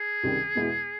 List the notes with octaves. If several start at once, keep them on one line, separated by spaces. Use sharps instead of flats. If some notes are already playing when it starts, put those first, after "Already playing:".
Already playing: G#4
C#2 C3 D#3 G3
E2 B2 G#3 B3 E4